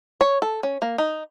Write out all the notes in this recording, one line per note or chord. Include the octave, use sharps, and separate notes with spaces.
C#5
A4
C#4
A#3
D#4